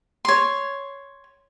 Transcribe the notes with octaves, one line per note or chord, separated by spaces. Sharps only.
C#5 C6